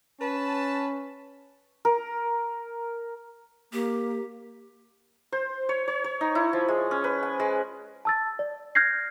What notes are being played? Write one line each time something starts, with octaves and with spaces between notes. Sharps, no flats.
C#4 B4 A5
A#4
A#3 G4
C5
C#5
C#5
C#5
D#4
E4
F3
G#3
C#4
B4
G#5
G#3
A5 E6 A6
D5
F6 G6 G#6 A#6 C7